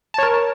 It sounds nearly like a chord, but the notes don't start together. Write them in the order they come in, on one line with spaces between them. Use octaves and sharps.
A5 C#5 A#4